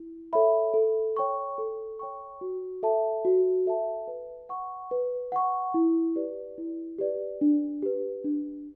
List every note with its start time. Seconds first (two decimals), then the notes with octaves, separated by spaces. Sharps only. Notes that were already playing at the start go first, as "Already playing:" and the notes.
Already playing: E4
0.33 A4 C#5 E5 B5
0.74 A4
1.17 C#5 G5 C#6
1.58 A4
1.99 C#5 G5 C#6
2.41 F#4
2.83 A4 E5 A5
3.25 F#4
3.66 A4 E5 A5
4.08 B4
4.49 F#5 C#6
4.91 B4
5.32 F#5 C#6
5.74 E4
6.16 G4 B4 D5
6.58 E4
6.99 G4 B4 D5
7.41 D4
7.82 G4 B4
8.24 D4